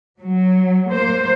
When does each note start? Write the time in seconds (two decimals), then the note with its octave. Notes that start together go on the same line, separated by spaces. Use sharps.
0.19 F#3
0.92 A#3 C5